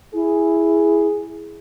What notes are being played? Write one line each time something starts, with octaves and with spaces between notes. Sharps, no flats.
E4 G#4